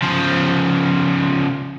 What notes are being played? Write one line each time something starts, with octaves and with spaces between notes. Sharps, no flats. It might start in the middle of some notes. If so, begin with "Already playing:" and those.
C#3 F3